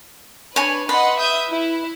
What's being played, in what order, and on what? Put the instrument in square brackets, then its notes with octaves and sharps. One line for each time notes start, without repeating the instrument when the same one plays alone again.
[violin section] D4 B4 [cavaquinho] C#5 G#5
[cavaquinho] B4 [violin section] D#5 F#5 C6
[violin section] E5 D#6 G6
E4